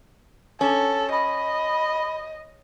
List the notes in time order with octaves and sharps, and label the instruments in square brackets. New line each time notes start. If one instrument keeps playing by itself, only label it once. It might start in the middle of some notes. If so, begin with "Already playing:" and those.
[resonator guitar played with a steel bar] C#4 [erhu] A4
[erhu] D#5 [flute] B5